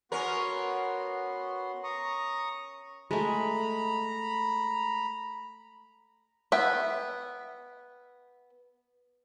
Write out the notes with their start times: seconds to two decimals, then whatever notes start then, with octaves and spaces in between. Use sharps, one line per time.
0.12 B3 C#4 F#4 A#4 C6
1.83 A#5 C#6 D#6
3.11 G#3 A3 A#5 B5
6.52 B3 E5 G5